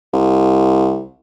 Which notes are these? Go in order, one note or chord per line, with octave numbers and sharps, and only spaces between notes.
C2